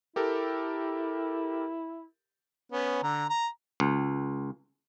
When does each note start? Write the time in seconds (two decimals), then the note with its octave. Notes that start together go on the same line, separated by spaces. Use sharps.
0.16 E4 G4 A4 A#4
2.72 B3 C#4
3.03 D3 A#5
3.29 A#5
3.80 C#2